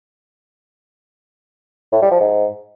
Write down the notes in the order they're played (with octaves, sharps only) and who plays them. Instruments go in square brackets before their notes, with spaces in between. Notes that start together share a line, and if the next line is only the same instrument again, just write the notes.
[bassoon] A2
G3
F3
G#2